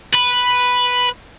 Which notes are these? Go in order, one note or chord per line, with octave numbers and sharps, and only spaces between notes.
B4